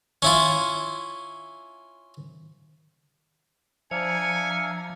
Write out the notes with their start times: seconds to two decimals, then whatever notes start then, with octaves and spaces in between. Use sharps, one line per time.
0.22 C#4 E4 F4
3.91 F3 D4 E5 F5 G#5 A#5 G#6 C#7